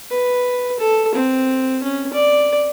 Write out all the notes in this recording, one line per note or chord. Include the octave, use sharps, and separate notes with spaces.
B4
A4
C4
C#4
D5